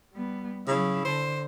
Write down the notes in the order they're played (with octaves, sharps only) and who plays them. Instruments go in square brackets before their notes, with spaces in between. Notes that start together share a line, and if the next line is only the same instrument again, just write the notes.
[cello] G3 B3
[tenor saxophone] C#3 [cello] F#3 E4
[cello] D3 [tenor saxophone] C5